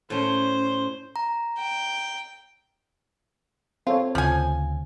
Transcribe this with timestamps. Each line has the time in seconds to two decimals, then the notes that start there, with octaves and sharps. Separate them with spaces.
0.10 A2 C#4 C5
1.16 A#5
1.58 G5
3.87 C4 F4 A4 C#5
4.15 D2 C#3 F3 G#5